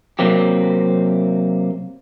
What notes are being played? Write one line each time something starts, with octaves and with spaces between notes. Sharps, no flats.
C3 F#3 A#3 C4 G4